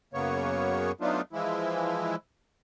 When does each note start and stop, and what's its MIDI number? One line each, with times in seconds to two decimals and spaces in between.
0.14 0.92 42
0.14 0.92 49
0.14 0.92 58
0.14 0.92 59
0.14 0.92 73
1.01 1.21 54
1.01 1.21 57
1.01 1.21 59
1.01 1.21 62
1.01 1.21 63
1.01 1.21 65
1.33 2.16 52
1.33 2.16 53
1.33 2.16 56
1.33 2.16 64